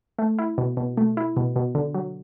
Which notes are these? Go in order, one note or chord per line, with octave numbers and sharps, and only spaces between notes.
A3
E4
B2
B2
A3
E4
B2
B2
D3
F#3